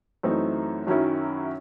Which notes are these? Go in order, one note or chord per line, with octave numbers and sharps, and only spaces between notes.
F#2 E3 A3 C4 D#4
F#2 D#3 F#3 C#4 E4